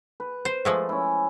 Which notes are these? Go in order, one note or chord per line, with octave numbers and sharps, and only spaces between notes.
B4
C5
F3 G#3 A3
C#4 E4